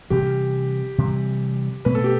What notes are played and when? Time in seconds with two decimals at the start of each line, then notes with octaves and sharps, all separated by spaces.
0.10 C3 E3 G3 G4
0.98 C3 E3 G3
1.85 B2 A3 C4 B4
1.95 A4
2.04 G4